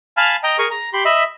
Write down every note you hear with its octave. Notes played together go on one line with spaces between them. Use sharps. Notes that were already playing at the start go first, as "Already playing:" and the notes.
F5 G#5 A5 B5 F6
D#5 G5 A#5
G#4 A#4 G#5 C#6
A#5
G4 B5 C6
D#5 E5 B5